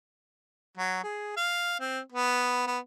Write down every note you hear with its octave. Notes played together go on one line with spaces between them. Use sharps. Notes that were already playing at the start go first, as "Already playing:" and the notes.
F#3
G#4
F5
C4
B3
B3